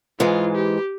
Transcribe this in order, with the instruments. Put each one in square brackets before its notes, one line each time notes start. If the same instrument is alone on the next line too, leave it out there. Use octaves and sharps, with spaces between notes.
[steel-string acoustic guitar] G#2 E3 G#3 [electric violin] F4
[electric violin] G4